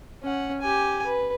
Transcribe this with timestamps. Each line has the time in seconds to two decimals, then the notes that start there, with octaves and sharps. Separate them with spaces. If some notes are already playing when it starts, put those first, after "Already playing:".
0.23 C#4 F#5
0.61 G4 G#5
1.06 B4